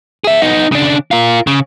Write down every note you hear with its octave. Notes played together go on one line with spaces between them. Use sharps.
G#4 E5
B3 D#4
C#3 D4
F4 A#4
C#3